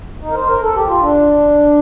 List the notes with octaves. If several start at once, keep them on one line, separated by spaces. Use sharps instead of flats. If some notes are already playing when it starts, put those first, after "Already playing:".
D#4
A#4
C5
A#4
A4
G4
F4
D4